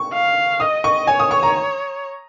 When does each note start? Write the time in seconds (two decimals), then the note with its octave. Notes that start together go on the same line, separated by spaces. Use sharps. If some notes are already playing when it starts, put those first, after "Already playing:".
Already playing: C#6
0.13 F5
0.60 D#5 D#6
0.84 C#6
1.07 C#5 G#5
1.20 D#6
1.31 C#6
1.43 A#5